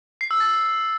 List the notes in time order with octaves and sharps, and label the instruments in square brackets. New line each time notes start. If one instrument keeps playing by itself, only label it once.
[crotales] C7
E6
A6